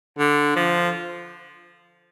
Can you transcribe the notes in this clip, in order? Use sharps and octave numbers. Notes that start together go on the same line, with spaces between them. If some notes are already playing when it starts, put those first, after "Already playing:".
D3
F3